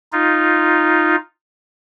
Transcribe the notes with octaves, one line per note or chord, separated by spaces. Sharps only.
D#4 F4